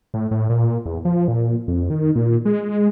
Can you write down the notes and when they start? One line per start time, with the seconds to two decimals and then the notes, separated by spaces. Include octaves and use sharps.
0.14 A2
0.31 A2
0.49 A#2
0.86 E2
1.05 F3
1.28 A#2
1.68 F2
1.90 D#3
2.15 A#2
2.45 G#3